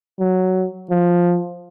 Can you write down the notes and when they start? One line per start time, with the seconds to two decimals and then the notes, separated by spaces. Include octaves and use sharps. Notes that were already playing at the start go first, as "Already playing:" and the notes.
0.20 F#3
0.90 F3